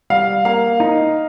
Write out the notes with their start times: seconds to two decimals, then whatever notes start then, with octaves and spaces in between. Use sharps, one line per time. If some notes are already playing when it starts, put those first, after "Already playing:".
0.10 G3 F5
0.45 A#3 F5
0.80 D#4